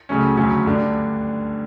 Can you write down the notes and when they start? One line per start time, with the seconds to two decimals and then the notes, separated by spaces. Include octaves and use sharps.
0.09 C#2 C#3 F#3 A3 C#4
0.37 D2 C#3 F#3 A3 C#4
0.66 G2 D3 A3